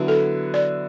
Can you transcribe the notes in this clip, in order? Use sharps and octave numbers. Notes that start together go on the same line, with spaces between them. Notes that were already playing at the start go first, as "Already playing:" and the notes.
Already playing: D3 F#3 B3 E4
A4
D5